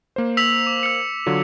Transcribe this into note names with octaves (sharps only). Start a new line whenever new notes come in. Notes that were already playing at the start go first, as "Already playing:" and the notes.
A#3 C5
E6 B6 F7
D6
E6 C#7
D3 F#3 F4